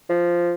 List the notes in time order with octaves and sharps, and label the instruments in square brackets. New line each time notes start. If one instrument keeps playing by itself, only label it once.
[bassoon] F3